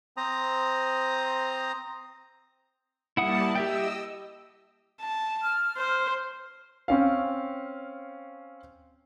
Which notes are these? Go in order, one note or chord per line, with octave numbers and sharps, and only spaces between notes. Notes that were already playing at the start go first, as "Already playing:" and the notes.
C4 C5 A#5 D#6
G3 A#3 E4 F#5 A5 D#6
G4 D#5 E5 G5 E6
A5
F6
C5
C4 C#4 F5